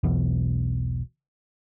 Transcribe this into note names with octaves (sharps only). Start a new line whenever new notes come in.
E1 B1 E2 B2